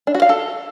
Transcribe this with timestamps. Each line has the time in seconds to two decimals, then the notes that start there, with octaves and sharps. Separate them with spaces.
0.07 D4
0.15 F#4
0.22 F5
0.29 A4